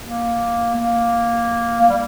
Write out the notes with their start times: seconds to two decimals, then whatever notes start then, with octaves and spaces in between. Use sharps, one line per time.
0.04 A#3
0.74 A#3
1.81 A#3
1.89 G3